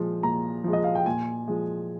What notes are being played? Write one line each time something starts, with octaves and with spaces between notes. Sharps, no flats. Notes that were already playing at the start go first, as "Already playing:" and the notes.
Already playing: A#2 F3 G#3
A#2 A#5
F3 G#3
D#5
F5
G5
A#2 G#5
F3 G#3